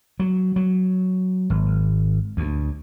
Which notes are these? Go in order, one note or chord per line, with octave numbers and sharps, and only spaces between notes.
F#3
F#3
G#1
D2